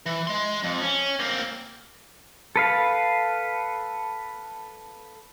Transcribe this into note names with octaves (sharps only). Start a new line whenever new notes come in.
E3
G#3 C6
F2
C#4
A#3 C4
A4 B4 F5